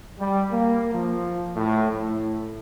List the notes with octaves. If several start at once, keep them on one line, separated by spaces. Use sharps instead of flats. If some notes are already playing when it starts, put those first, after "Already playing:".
G3
A#3
F3
A2
A2